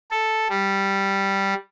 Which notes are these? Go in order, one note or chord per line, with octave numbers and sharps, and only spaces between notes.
A4
G3